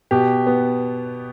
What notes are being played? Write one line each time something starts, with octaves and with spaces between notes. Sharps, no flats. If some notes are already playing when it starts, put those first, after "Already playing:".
B2 G4
B3